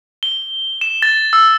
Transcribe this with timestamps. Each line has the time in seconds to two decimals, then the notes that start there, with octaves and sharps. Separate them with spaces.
0.23 G7
0.81 E7
1.02 A6
1.33 E6